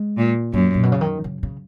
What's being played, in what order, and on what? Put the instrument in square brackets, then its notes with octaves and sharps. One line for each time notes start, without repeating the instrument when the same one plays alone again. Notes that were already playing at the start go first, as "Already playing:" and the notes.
Already playing: [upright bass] G#3
[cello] A#2
[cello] F#2 [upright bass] A#3
[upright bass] A#2
B2
C#3
D#3
C#3
C#3